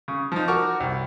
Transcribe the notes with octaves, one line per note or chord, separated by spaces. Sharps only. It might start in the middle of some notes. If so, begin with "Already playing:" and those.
C#3
F3 D#4
F#4 A#4 C#6 D6
C2